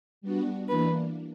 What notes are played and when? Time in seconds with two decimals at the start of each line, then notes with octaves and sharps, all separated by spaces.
0.21 G3 B3 D4 F#4
0.69 E3 A#3 D4 B4